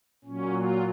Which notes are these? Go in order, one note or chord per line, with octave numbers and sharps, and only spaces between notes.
A#2 F#3 C#4
F4